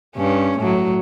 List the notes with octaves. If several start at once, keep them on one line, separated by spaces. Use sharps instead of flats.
G2 C#4
A2 F#3